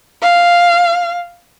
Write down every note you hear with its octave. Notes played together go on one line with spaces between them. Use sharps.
F5